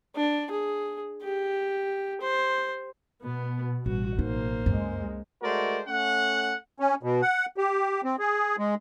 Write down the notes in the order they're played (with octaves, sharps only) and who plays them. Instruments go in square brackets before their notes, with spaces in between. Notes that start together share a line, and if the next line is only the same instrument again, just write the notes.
[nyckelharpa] D4
G#4
G4
C5
[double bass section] B2 [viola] B3
[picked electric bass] A1 [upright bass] G3 [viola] F#4
[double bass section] B1 [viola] A#3 C5 [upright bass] D#4
[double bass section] C#2 G#3 [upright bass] F#2
[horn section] G#3 A3 F#4 A#4 C5 D5
A3 C#4 F#5
[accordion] C#4
B2
F#5
G4
C4
G#4
G#3